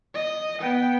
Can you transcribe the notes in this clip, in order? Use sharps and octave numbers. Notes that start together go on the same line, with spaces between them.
D#5
B3 G5